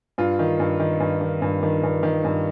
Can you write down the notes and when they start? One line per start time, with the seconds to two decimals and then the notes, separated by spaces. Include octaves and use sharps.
0.18 G2 F4
0.39 D#3
0.60 G2
0.80 D#3
1.00 G2
1.21 D#3
1.42 G2
1.63 D#3
1.83 G2
2.03 D#3
2.24 G2